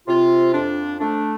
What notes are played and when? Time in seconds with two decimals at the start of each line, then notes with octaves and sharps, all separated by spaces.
0.07 C3 F4
0.54 F2 D4
1.00 A3 D4